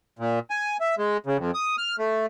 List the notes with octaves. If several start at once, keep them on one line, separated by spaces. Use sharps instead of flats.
A#2
G#5
E5
G#3
C#3
F2
D#6
F6
A3